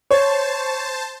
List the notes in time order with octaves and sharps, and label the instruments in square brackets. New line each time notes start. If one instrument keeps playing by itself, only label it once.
[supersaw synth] C5 A5 [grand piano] C#5